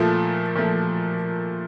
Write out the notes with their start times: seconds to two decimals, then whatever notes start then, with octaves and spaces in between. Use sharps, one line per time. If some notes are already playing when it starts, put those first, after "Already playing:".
Already playing: A#2 F3 A3
0.56 A#2 F3 A3